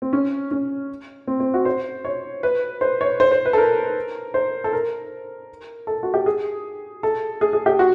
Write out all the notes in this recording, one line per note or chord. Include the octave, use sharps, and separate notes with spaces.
C4
C#4
C#4
C4
C4
F#4
C5
C#5
B4
C5
C#5
C5
C5
B4
A4
A#4
C5
A4
A#4
A4
F#4
G4
G#4
A4
G#4
G#4
G4
F#4